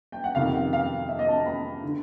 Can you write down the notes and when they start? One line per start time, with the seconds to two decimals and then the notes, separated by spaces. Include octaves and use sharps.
0.12 G5
0.24 F#5
0.35 F2 C3 D#3 F5
0.54 F#5
0.73 F5
1.09 E5
1.19 D#5
1.28 A5
1.37 A#5
1.46 B5
1.84 D3